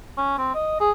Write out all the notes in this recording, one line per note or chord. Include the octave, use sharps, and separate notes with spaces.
C#4
C4
D#5
G#4